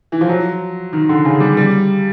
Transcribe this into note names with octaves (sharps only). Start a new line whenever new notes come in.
E3
F3
F#3
D#3
D3
C#3
G3
G3